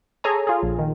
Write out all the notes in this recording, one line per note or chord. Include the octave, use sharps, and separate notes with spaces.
G#4 A4 C#5 G#5 A#5
F4 G#4
A#1
D#3